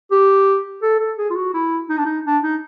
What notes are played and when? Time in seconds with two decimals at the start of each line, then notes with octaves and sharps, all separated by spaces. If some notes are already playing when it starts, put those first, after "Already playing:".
0.11 G4
0.83 A4
1.00 A4
1.18 G#4
1.30 F4
1.36 F#4
1.54 E4
1.89 D#4
1.98 D4
2.05 D#4
2.25 D4
2.43 D#4